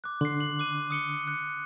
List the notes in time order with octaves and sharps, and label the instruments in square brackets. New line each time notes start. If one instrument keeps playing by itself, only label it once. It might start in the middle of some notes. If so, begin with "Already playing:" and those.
[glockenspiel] D6 F#6
[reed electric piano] D3 [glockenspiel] C6 C7
[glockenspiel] F#7
D6 F#6 D#7
D#6 C#7 G7
F#6 C#7